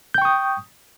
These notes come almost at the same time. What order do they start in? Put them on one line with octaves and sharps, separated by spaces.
G6 G5 C#6 D#6